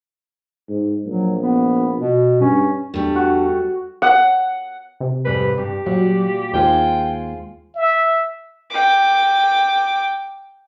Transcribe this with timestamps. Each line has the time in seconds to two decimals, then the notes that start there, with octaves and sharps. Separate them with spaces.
0.69 G#2
1.06 A#1 F#3
1.41 B3
1.99 B2
2.41 G2 C#4
2.94 E2 G3 A3 D4
3.16 F#4
4.02 F#5
5.00 C3
5.25 F2 G#2 G3 B4
5.58 G2 G4
5.86 A#2 F#3 G3 F#4
6.54 D#2 G#3 F4 C5 G5
7.76 E5
8.71 G5 D6